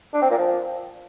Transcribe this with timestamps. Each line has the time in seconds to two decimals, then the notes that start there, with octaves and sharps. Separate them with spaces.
0.14 D4
0.22 C4
0.30 A#2
0.38 F3